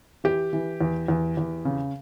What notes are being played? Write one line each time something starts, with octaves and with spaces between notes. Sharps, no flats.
E3 G4
E3
E2
E2
E2
C#3